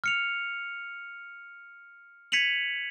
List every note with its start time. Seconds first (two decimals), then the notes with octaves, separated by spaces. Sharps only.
0.04 F6 C#7 F7
2.32 G#6 B6 C#7 D#7 F7 F#7